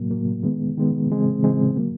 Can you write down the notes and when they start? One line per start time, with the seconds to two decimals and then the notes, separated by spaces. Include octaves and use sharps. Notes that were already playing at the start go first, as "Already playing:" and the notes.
Already playing: A2 F#3 A#3
0.11 A2 F#3 A#3
0.43 D#3 G#3 B3
0.77 D#3 G#3 B3
1.10 C#3 E3 G#3 C4
1.43 C#3 E3 G#3 C4
1.76 D3 F#3 A#3